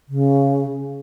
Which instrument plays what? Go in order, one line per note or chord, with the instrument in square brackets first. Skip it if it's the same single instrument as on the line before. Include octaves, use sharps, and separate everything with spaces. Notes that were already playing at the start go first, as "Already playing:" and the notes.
[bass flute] C#3